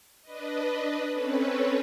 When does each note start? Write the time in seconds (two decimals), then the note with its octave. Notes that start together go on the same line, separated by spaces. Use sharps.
0.22 D4 B4 D#5
1.13 C4 C#4 A4 B4 C#5